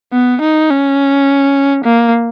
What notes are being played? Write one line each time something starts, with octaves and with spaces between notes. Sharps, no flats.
B3
D#4
C#4
A#3